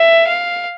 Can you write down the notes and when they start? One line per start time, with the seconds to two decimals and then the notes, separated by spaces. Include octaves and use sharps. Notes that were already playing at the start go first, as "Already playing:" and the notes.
Already playing: E5
0.28 F5